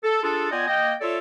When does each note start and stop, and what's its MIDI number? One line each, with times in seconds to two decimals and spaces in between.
0.04 0.19 69
0.23 0.47 62
0.23 0.47 65
0.23 0.47 68
0.23 0.47 69
0.52 0.66 59
0.52 0.66 65
0.52 0.66 74
0.52 0.66 75
0.52 0.66 79
0.52 0.66 80
0.68 0.94 58
0.68 0.94 75
0.68 0.94 79
1.01 1.18 65
1.01 1.18 69
1.01 1.18 73
1.01 1.18 74
1.01 1.18 76